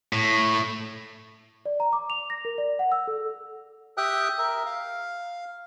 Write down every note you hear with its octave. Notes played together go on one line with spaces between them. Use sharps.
A2
D5
A#5
D6
F7
A#6
A#4
D5
F#5
E6
A4
G4 E5 G5 D#6 F#6
A#4 E5
F5